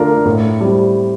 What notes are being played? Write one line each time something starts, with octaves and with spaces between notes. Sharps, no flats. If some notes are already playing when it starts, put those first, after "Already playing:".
Already playing: D3 A3 D4 F4 A#4
A2
G3 C4